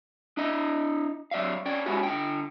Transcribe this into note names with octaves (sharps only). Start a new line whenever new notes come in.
D4 E4 D#5
F#3 D5 E5 F5
C#4 D5 G5
G#3 C#4 E4 F#4 G4
D3 G5